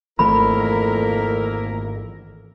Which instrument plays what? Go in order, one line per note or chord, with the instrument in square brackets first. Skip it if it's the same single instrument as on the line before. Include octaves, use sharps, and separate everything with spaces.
[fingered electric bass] G#1 E3 A3 [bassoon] F2 [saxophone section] A#3 E4 A#4 [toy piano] B5